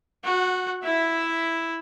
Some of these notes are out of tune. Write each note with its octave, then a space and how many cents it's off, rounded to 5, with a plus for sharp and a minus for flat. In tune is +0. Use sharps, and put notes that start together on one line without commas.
F#4 -20 F#5 +0
E4 +0 E5 +0